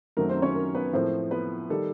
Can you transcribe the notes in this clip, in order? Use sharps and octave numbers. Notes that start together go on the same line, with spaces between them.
F#2 D#3 F#3 A3 C4 A#4
C4 C5
C#4 C#5
A#4
B3 B4
A2 F3 A#3 C4 C5
B3 B4
D#3 G3 A4